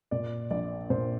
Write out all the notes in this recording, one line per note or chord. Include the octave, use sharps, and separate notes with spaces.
A#2 D5
A#1 D5
A#2 C5